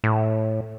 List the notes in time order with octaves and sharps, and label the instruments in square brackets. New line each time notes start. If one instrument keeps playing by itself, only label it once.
[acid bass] A2